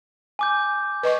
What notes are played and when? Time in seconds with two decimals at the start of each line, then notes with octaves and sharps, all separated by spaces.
0.39 G#5 D6 G6
1.03 B4 D#5 C#6